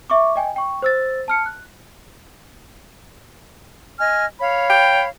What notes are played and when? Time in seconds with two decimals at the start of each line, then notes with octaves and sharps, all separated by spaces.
0.10 E5 C#6 D6
0.36 D#5 G5 G#5
0.56 G5 C#6
0.82 C5 E6 A6
1.28 A5 F6 C#7
1.46 F#6
3.99 D#5 G#5 F6
4.40 C#5 F5 B5
4.70 G5